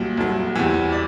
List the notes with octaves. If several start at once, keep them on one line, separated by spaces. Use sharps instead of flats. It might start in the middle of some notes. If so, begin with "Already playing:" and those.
Already playing: C2 A#2 F#3
C2 A#2 F#3
E2 C3 E3
D5